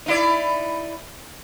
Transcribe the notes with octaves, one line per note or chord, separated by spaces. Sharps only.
D#4 E4 D5